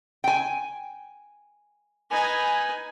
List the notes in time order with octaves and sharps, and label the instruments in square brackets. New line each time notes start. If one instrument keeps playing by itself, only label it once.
[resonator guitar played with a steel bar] G5 G#5
[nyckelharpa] D#4 B4 [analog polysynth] G#5